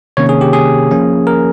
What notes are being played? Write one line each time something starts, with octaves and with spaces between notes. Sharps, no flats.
C3 D#3 A#3 C#4 C#5
G#4
G4
G#4
F3 A#3 C#4
A#4